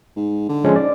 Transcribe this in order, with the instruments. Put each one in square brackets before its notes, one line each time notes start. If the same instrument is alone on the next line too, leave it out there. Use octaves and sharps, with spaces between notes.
[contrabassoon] G#2
D3
[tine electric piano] F3 G#3 C#4
[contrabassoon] G#2 [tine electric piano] D5